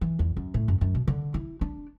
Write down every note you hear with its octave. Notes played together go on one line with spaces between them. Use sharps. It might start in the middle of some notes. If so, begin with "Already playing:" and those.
E3
E2
F#2
A2
F#2
F#2
B2
D3
E4
D4